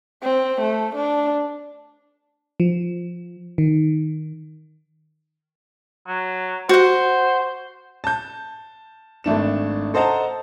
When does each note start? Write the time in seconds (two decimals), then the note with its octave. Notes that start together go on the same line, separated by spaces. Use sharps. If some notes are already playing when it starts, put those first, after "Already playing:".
0.23 C4
0.61 A3
0.96 D4
2.60 F3
3.58 D#3
6.07 F#3
6.69 F#4 C5 F#5
8.04 A5 G6
9.24 G#1 A3 D4 E7
9.94 A4 C5 D#5 F#5 A5 A#5